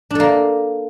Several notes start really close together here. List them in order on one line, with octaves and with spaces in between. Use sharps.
D4 A4 A#3